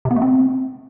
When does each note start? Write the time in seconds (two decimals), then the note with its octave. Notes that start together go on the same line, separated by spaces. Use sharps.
0.05 C3
0.11 B3
0.16 A3
0.22 C4